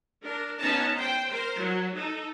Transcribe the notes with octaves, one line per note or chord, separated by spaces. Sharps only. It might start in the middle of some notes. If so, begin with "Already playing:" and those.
D4 A#4
B3 C#4 D#4 A5 A#5
C5 G5
A#4 C5
F#3
D#4 A4